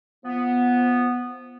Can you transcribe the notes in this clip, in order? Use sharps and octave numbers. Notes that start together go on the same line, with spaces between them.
F3 B3